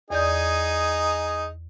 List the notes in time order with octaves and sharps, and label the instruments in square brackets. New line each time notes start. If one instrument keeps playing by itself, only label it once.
[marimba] E2 D5 G6 [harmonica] D#4 G#4